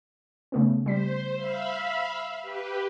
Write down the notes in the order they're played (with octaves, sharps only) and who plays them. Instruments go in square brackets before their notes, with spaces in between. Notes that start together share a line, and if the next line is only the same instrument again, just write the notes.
[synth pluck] C#3 A3 B3
[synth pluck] G3 B6 [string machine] C5
[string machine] E5 F5 B5
G4 B4